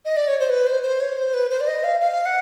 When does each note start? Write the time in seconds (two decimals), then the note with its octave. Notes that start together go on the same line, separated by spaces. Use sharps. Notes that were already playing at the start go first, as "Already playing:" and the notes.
0.05 D#5
0.16 D5
0.28 C#5
0.40 C5
0.49 B4
0.67 C5
0.83 C5
1.00 C#5
1.17 C5
1.34 B4
1.50 C5
1.61 D5
1.67 D#5
1.84 F5
2.00 F5
2.26 F#5